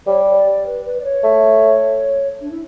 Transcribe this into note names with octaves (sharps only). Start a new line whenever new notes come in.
G3 C#5
C#5
D5
D5
B4
B4
D5
C#5
A3
D4
E4